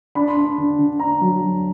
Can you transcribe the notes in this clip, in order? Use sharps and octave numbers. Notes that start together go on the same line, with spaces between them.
D4 B5
C6
D4 B5
D3
D3
D4 A#5
F#3
F#3